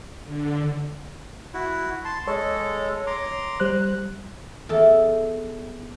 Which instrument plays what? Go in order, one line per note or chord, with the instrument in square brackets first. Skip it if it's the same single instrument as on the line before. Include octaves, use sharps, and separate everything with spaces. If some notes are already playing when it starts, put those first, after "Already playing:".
[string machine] D3
[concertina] E4 F#4
A5 C6
[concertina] G#3 A4 [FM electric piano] C#5
[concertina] A#5 C6 D6
[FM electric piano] G3 C5 F#6
[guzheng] E2 A4 A5